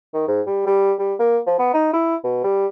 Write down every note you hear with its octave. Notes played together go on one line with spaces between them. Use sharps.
D#3
G#2
G3
G3
G3
A#3
F3
B3
D#4
E4
B2
G3